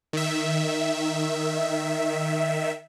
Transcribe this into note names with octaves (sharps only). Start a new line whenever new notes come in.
D#3 E5